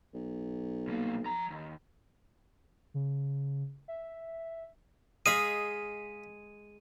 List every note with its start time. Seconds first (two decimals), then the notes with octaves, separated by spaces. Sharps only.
0.14 B1
0.87 C2 A#3
1.26 F3 A#5
1.50 D#2
2.94 C#3
3.88 E5
5.26 G#3 G#4 D#5 F5 B5 D#7